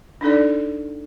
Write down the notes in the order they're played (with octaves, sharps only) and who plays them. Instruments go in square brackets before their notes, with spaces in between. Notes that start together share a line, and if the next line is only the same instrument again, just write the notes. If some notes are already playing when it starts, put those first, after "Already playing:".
[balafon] D4 D#4 A4 D5